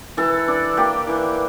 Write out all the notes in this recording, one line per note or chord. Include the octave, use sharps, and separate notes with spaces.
E3 A4
D4
A#3 G4
E3